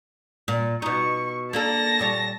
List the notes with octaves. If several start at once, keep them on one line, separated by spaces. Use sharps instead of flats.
A#2
B2 D#4 C#6
A#3 D4 A4 A5 A#6
A#2 G3 C#5